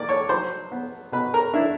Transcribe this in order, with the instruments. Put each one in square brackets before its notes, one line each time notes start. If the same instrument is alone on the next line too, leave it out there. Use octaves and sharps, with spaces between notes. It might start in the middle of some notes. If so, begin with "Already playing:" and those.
Already playing: [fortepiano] A#3 D5 D6
C#5 C#6
F#3 C5 C6
B3
B2 B4 B5
A#4 A#5
D4 E4 E5